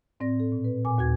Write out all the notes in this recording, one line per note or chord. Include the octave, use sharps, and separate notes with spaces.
A2 C4 D5 A#6
A4
A#2
B4
A#2 G#5 D6
D#2 F#4 G#6